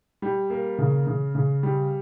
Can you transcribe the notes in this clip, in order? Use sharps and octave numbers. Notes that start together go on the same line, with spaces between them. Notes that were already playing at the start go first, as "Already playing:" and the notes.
G3
A#3
C#3
C#3
C#3
G3